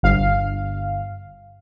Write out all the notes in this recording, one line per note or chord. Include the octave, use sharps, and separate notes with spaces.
G1 F5